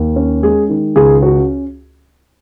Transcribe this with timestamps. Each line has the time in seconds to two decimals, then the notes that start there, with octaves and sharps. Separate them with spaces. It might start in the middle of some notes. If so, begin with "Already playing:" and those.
Already playing: D#2
0.16 C#4
0.43 G#3 G#4
0.69 D#3
0.96 C#2 G#4
1.22 C#4 F#4